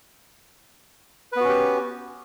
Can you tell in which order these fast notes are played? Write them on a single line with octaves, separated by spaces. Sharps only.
B4 B3 F#4 C#4 G4